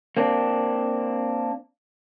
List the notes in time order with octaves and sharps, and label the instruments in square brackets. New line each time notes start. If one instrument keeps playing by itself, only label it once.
[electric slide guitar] A#3 C4 D4